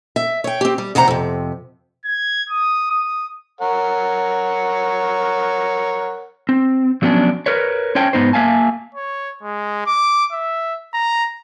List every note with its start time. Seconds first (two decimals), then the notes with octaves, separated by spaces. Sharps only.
0.16 E5
0.44 C#5 G5
0.61 C4 G4
0.78 G3
0.95 E2 C3 C5 F#5 A#5
1.08 F2 C3
2.05 G#6
2.50 D#6
2.90 D#6
3.61 A#4 C#5 F#5
6.49 C4
7.02 F3 F#3 B3 C#4 D4
7.46 A#4 B4 C#5
7.95 C#4 C5 C#5 G5 A5
8.13 G#2 B2 B3 D#4 C5
8.33 A#3 E5 F5 G#5 A5
8.95 C#5
9.43 G#3
9.86 D6
10.32 E5
10.94 A#5